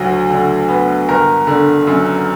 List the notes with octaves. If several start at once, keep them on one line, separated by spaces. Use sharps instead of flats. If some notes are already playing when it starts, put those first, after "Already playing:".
Already playing: D2 F#3
D3
B3
G1 A#4
D3
F#2